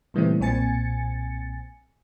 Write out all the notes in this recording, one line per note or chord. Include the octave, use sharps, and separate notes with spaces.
A#2 C#3 E3 G3 A3 C4
B1 A#2 C4 G#5 A6 C#7